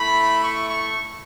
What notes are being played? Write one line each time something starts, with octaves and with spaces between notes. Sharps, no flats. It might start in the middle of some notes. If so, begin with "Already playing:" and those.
Already playing: A3 E4 B5
C#6
C#6